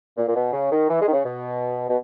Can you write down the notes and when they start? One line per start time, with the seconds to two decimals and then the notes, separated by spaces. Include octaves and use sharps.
0.17 A#2
0.28 A#2
0.35 B2
0.53 C#3
0.71 D#3
0.90 E3
1.01 G#3
1.07 D#3
1.13 C#3
1.25 B2
1.88 B2